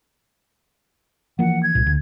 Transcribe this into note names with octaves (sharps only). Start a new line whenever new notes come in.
E3 F3 A#3 F#5
G#6
C2 A#2
D2